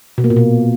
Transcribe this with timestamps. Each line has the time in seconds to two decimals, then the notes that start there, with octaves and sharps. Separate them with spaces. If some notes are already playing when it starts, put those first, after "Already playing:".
0.18 B2
0.24 A#3
0.30 A#2
0.36 B2